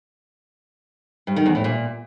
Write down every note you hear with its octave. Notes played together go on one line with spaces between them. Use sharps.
G2
D#3
E2
A2
A#2